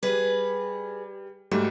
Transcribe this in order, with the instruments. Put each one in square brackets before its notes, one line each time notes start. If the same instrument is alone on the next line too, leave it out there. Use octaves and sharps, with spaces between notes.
[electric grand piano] G3 [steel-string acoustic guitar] G#4 B4
[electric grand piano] G#2 G3 A3 [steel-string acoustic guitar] F#4